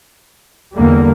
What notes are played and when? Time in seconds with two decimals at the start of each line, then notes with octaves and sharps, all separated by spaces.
0.76 E2 D3 G3 A#3